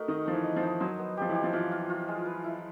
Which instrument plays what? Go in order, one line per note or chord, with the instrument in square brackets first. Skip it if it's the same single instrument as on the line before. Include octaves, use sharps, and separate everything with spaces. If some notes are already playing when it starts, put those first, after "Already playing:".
Already playing: [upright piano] A3 [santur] D#4 F#4 A#4
[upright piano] D#3 [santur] D#5
[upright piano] F3 [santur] D#4
[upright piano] E3
[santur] D#5
[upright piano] F3
[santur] D#4
[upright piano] F#3 [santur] C5
[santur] B3
[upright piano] F3 [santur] G4
[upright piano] E3
[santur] G4
[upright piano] F3
[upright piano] E3 [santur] F4
[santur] F4
F4
G#3
B4
E4